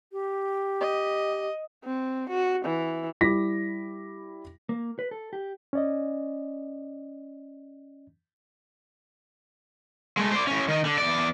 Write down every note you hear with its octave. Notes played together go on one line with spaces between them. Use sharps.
G4
D#5
C4
F#4
E3
G3 E4 D6 A#6 B6
A#3
B4
A4
G4
C#4 D5 D#5
G#3 A3
C5 D5
A2 C#4
D#3 D#4
D3
E2 D5